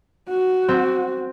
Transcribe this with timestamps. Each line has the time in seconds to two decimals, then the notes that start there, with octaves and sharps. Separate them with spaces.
0.29 F#4
0.68 C4